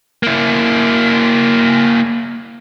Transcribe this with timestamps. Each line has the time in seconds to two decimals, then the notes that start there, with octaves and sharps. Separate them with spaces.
0.23 A#3 E4